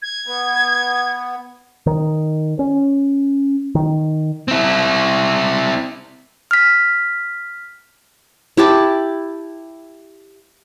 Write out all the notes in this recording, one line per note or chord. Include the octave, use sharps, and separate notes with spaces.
G#6
B3
D#3
C#4
D#3
C4 E4
F6 B6
E4 G4 A5 B5